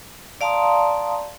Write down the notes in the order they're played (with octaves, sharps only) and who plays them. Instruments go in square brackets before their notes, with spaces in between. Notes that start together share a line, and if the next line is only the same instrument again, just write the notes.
[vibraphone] D5 F5 A5 A#5 C6 D#6